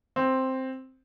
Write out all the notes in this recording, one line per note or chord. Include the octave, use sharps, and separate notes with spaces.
C4